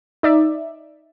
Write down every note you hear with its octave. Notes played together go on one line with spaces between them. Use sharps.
D#4 D5 E5